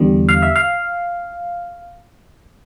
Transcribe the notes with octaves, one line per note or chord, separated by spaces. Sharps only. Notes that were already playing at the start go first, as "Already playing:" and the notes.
Already playing: E2 D3 G3
F5
E5
F5